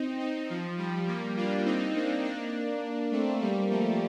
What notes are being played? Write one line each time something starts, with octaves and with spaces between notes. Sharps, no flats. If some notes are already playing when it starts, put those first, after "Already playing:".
Already playing: C4 D#4
C4 D#4
F3
G3
G3 A#3
D4 F4
C4 D#4
A#3 D4
A#3 D4
A3 C4
G3 A#3
F3 A3